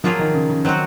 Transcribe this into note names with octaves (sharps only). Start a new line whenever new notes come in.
F3 F#3 A#3 F4 G#4
D#3
C#3
C#3
D#3 F#3 C4 F#4